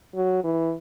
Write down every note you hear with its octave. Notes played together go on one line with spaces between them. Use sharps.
F#3
E3